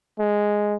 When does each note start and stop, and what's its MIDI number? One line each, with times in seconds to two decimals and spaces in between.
0.19 0.76 56